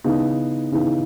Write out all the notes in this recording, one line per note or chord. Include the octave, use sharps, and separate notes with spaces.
C#3 E3 B3 D#4
C#3 E3 B3 D#4